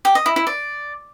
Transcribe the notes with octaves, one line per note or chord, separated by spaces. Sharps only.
G4
D#5
E4
E4
D5